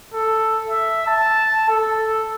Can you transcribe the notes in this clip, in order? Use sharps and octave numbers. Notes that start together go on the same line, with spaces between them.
A4
E5
A5
A4